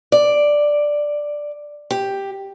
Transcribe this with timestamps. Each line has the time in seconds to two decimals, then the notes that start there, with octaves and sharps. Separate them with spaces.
0.12 D5
1.91 G4